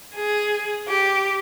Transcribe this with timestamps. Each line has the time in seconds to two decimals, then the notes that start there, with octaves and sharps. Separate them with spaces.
0.15 G#4
0.88 G4